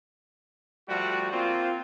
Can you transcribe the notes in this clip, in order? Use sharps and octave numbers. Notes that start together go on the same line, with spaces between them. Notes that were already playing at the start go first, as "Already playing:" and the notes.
F3 G3 A3 F#4
A#3 C4 F4